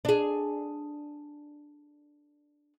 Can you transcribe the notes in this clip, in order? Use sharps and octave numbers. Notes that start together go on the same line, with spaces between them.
D4 G#4